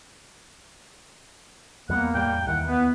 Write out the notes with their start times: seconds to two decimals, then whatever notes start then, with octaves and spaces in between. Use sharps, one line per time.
1.89 E2 G3 A#3 B3 F#5
2.14 E2 A2 G3 G5
2.47 D#2 D#3 E3 F#5
2.67 B3 B4